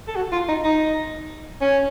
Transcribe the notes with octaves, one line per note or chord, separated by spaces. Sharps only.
A4
F#4
F4
D#4
D#4
C#4